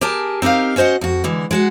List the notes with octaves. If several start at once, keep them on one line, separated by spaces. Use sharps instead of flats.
G4 G#4 A#4 G#5 A5
C4 D#4 G4 A#4 F5
C#4 F#4 C5 D#5 F#5
F2 F#4
D3 E3 G#3
G#3 F#4 F#5